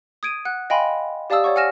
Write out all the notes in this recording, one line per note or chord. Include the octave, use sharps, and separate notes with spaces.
D#6 G#6 D7 D#7
F#5 F#6
D#5 F5 G5 G#5 B5 C6
G4 D5 F5 A5 D#6 E6
C#5 D5 F#5 C#6
F#5 G#5 F6 A#6 E7